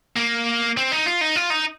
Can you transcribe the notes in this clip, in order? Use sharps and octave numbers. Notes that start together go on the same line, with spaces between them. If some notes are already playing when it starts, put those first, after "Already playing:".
A#3
C4
D#4
F4
D#4
F4
D#4